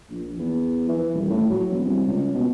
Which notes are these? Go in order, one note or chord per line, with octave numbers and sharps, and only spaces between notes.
A#1
E2
E3
D#1
A2
F#3
E1
C2
C#2
B2